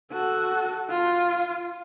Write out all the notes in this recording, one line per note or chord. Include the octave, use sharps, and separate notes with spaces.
F#4 A4
F4